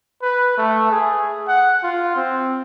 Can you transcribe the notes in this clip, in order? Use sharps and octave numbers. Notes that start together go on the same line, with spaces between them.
B4
A3
G#4
F#5
F4
C4